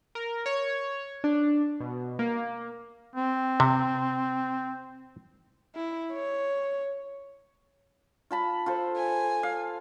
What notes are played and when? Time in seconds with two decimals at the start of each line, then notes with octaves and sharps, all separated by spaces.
0.15 A#4
0.46 C#5
1.24 D4
1.80 B2
2.19 A#3
3.16 C4
3.60 C3
5.75 E4
6.12 C#5
8.31 F4 A5 B5
8.66 F4 A4 C5
8.96 G#5
9.43 F5